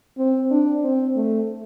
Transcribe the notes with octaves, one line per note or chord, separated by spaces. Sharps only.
C4
D4
C4
A3